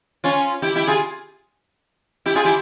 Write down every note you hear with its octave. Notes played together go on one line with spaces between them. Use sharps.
C#4 F4
E4 G4
E4 G4
F4 G#4
E4 G4
F4 G#4
E4 G4